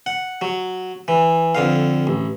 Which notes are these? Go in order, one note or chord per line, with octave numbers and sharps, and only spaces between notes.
F#5
F#3
E3
F2 D3 F5
A1